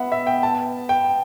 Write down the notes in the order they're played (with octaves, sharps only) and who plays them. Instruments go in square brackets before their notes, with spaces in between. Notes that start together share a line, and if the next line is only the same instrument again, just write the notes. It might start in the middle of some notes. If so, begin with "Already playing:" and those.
Already playing: [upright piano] B3 [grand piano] E5 F#5
[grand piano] E5
G5
A5
G5